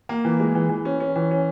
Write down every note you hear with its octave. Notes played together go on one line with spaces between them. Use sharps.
A#3
E3
G#3
E3
E3
C#4
C#4
E3
C#4